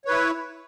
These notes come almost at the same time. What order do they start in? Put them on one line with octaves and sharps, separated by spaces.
C#5 B4 E4